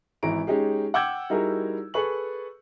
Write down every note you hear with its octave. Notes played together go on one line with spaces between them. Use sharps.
G#1 E3 E4 A#5 D7
G#3 C#4 D#4 G4 G#4
F#5 G5 D6 E6 G6 G#6
G3 D#4 E4 F#4 G#4 A#4
G#4 A4 B4 C#6 F#7